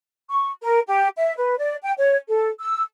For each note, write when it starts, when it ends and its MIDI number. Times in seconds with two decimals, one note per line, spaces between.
0.29 0.51 85
0.62 0.79 70
0.87 1.08 67
1.17 1.33 76
1.37 1.55 71
1.58 1.75 74
1.83 1.92 79
1.98 2.16 73
2.28 2.49 69
2.60 2.81 88